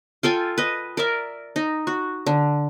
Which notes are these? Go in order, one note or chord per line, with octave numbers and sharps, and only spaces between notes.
F4 A4 G5 G#5
B4 D#5
A#4 D5 E5
D#4
F#4
D3